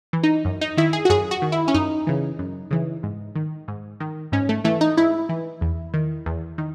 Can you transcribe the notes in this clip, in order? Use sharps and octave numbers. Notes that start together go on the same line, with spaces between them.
E3
D#4
F#2
D#4
D#3 E4
G#4
F#4
F#2 G#4
F#4
D#3
E4
C#4
F#2 D#4
C#3 E3
F#2
C#3 E3
G#2
D#3
G#2
D#3
G#2 C#4
A3
E3 A3
D#4
G#2 E4
E3
E2
D#3
E2
D#3